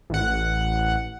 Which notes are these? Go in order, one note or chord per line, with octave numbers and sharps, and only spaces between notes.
A1 F#5